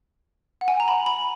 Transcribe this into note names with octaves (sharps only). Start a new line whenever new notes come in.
F#5
G#5
A#5
B5
B5